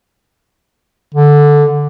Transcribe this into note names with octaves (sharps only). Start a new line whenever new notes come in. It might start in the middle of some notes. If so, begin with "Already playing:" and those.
D3